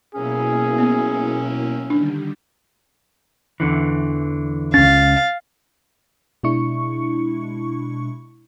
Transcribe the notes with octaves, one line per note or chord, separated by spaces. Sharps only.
D#2 B2 F#3 A#3 C#4 E4 G#4
B3
D3 D#3 G3 D4
E2 D3 E3
C#2 C#4 F5 A6
B2 G#3 D4 E4 C#6 C#7